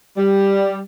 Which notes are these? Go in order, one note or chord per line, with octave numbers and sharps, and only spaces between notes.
G3